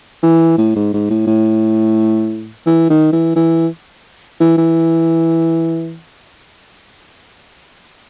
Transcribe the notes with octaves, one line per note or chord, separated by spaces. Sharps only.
E3
A2
G#2
G#2
A2
A2
E3
D#3
E3
E3
E3
E3